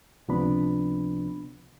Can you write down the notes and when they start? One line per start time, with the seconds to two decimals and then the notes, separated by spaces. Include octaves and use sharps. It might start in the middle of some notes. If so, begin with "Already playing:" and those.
0.28 C#2 C3 F3 B3 D4 B5